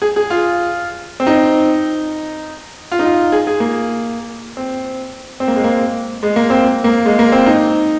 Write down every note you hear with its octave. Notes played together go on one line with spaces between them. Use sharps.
G#4
G#4
F4
C4
D#4
F4
D#4
F4
G#4
G#4
A#3
C4
C4
A#3
G#3
A#3
G#3
A#3
C4
A#3
G#3
A#3
C4
D#4